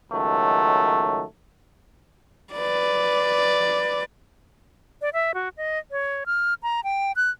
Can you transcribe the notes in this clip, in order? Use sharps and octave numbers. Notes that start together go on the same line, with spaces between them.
C#2 D#3 F#3 A3
B4 D5
D5
E5
F#4
D#5
C#5
F6
A#5
G5
F#6